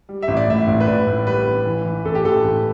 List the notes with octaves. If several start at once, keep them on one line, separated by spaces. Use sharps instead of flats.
G3
E5
A1
D5
A2 E5
A1
B4
A1 D5
A2
G3 B4
A1
E3
E3
A1 A4
G4
A1 A4
A1